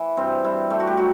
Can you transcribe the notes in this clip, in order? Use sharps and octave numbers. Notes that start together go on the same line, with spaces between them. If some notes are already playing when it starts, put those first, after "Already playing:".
Already playing: E3
G2 C4
G2 E4
A3 G4
F#4
G4
F#3 F#4